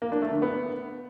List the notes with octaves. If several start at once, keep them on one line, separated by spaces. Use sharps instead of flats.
A#3
D4
A3
D3
B3